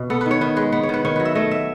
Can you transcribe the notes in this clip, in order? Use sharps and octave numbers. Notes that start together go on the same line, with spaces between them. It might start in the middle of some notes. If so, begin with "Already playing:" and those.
Already playing: B2
B3 A4
D#3 B4
C#5
D#3 B4
G#3 B4
B3 B4
C#5
D#3 B4
D#3 C#5
F#3 B4
E5
A3 D#5
E5